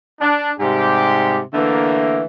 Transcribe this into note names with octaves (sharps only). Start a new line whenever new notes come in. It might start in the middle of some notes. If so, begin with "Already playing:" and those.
D4
G#2 C3 G3 G4
D3 E3 A3 A#3